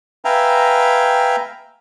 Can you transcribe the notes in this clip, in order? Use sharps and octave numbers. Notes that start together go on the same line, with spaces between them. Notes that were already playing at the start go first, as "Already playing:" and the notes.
B4 E5 F5 G5 G#5 A#5